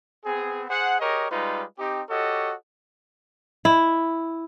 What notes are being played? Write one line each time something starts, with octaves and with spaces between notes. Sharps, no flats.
B3 C4 G#4
G#4 C5 F#5
G4 G#4 A#4 C#5 D#5
G3 G#3 D#4 F4 B4
C4 D#4 G4
F#4 G4 A4 C#5 D#5
E4